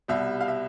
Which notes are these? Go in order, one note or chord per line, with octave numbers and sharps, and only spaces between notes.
C2 B2 G3 E5
F5
E5